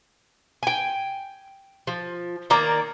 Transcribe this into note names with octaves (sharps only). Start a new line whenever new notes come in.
G5 G#5
F3
D#3 A#3 D5 A#5